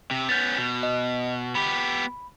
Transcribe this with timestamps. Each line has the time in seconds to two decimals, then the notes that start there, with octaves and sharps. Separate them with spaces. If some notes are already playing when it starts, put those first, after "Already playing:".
0.11 C3
0.29 B3 C#4 G6 A6
0.57 B2
0.83 D#5
1.55 B3 G4 B5